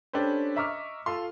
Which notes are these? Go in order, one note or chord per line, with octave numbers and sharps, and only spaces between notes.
C#4 D4 G4 A4 B4 C5
D#5 E5 A#5 C#6 D6 F6
F4 A4 F5 C6